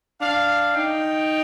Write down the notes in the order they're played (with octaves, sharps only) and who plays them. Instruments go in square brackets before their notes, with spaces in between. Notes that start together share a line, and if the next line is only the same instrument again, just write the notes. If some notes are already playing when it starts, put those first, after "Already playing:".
[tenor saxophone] D4 [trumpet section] F5
[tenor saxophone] D#4 [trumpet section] G5